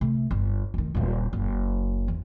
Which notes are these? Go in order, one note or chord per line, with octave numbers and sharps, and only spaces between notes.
C3 A3
G1
F1 D#3
D#1 C#3
F#1
E2